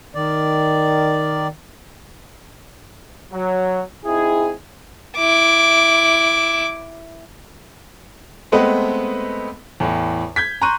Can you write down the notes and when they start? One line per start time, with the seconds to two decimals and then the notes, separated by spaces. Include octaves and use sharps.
0.15 D#3 D5
3.33 F#3
4.06 C4 D#4 E4 G#4
5.18 E4 D6
8.52 G#3 A3 B3 C4 B4 D#5
9.80 E2 A2
10.36 G6 G#6 B6
10.62 A#5 C6 C#6 F#6 D#7